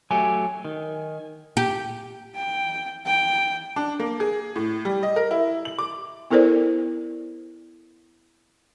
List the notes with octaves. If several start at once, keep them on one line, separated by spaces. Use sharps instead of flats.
F#3 A3 G4 G#5
D#3
G4
G5
G5
D4
A#3
G#4
A2
G3
D#5
A#4
E4
F#7
D6
B3 E4 A4 A#4 C5 D5